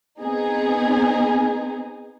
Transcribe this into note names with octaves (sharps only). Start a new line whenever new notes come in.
B3 C4 D#4 G#4